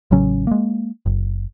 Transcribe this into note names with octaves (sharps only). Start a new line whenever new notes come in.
A1 C#3 F#3 C#4
G#3 A#3
F#1